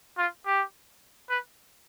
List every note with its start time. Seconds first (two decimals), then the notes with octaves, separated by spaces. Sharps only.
0.18 F4
0.46 G4
1.30 B4